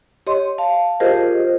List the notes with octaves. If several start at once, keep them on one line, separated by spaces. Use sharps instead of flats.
G4 C#5 D#5 C6
F5 A5
F4 G4 G#4 A#4 C5 D#5